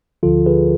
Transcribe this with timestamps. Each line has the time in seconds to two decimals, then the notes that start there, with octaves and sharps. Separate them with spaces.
0.23 D2 D3 F3 F4 A4
0.46 G#4 B4